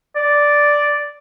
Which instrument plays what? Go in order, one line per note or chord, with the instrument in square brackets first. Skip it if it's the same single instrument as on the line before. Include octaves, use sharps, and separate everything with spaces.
[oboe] D5